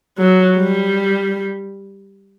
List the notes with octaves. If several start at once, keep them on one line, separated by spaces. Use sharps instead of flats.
F#3
G3